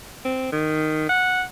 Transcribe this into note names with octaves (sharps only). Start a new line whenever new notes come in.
C4
D#3
F#5